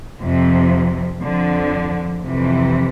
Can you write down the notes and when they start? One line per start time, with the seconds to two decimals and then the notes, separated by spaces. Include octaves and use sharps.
0.20 F2 C3 F3
1.22 F2 D3 F3
2.23 F2 C3 E3